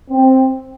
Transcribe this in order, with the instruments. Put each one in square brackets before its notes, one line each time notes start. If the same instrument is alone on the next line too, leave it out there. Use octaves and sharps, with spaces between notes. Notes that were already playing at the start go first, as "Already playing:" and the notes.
[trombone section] C4